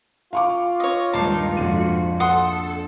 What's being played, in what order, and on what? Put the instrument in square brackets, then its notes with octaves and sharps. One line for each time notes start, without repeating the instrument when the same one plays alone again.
[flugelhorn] F4 [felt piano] F5 C#6 D6
[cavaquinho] C#5 D#5
[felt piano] D#1 D6 C7 [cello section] G2 G#3 D#4 [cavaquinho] A5
[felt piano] A#1 F2 D#7 [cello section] G#2 F#4
[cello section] A4 [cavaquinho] F#5 C6 D#6